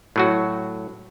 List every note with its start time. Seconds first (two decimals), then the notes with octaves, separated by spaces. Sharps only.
0.16 A2 F#3 F#4